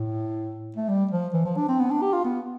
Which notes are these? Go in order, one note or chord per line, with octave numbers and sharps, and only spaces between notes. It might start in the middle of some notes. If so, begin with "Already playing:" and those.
Already playing: A2
A3
G3
F3
E3
F3
D4
C4
B3
D4
G4
F4
B3